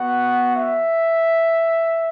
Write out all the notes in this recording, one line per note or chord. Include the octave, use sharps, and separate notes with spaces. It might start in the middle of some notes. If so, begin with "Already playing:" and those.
Already playing: B3 F#4 F#5
E5